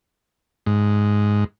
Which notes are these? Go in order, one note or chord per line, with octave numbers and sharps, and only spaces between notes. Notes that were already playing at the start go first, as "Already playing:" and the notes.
G#2